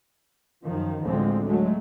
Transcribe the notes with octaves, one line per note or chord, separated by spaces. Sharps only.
F#2 D#3 F3
A1 D2 D3 F3 G#3 C4
F#3 G#3 A3